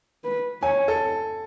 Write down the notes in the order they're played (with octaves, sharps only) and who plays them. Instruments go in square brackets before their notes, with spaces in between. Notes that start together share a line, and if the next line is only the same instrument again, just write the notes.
[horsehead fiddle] B4
[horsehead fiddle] C#5 [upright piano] G#5
[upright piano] A4